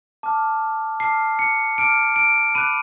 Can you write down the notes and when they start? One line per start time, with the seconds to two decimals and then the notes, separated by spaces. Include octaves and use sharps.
0.23 A5 D6 F6
1.00 A5 D6 F6 C7
1.39 C#7
1.78 A5 D6 F6 D7
2.16 D7
2.55 B5 D6 F#6 D#7